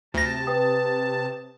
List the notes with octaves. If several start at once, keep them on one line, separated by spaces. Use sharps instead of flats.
D2 C3 A5 A#6
B4 G5 D#6